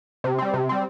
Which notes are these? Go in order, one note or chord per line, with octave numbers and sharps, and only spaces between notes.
C3
G3 C4
C3
G3 C4